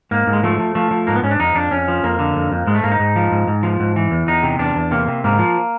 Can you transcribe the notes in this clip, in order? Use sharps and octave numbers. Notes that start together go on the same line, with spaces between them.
G#2 A#3
G#2
G#3
F3 A3
F3
F3 A3
F3
G#2 A#3
B3
G#2 C#4
D4
F2 D#4
F2 D4
F2 C#4
F3
F2 A#3
D3
F2
F2
G#2 G#3
A3
G#2 A#3
D#4
G#2
F3
G#2
G#2
F3
G#2
E3
E2
E2 D#4
C3
E2 D4
E2
C3 A#3
C3
G#2 A#3
F3